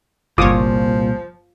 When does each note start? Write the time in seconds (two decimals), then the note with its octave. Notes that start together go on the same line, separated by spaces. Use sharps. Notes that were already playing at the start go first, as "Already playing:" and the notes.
0.38 G1 C2 A#2 F3 F4 C#5 D6 D#6